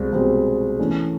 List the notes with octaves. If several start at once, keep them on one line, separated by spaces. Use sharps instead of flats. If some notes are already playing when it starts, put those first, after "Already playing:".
Already playing: C2 B2 G#3 C4
C2 B2 G#3 C4
E3 A3 C#4